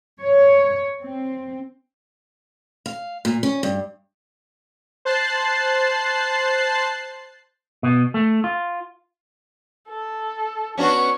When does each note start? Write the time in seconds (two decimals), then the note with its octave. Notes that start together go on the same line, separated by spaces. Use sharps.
0.21 C#5
1.02 C4
2.86 F5
3.25 A#2
3.43 C#4
3.63 G2
5.05 C5 A5 F#6 A6 C7
7.83 B2
8.14 A3
8.44 F4
9.88 A4
10.78 B3 C#4 D4 F#4 C#6